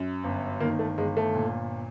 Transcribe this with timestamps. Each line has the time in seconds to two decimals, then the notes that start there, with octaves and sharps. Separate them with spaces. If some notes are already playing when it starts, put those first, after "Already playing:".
Already playing: F#2
0.24 G1
0.60 D#3 A#3
0.79 A3
0.98 G1 G#3
1.17 A3
1.35 A#2